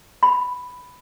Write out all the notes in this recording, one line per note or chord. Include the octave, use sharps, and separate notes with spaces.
B5